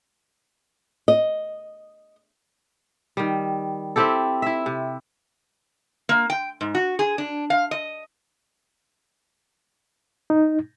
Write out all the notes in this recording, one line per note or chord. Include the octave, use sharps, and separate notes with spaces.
D#5
D#3 G3
C4 E4 G4 A4
E4 E5
C3
A#3
G5
G#2
F#4
G#4
D4
F5
D#5
D#4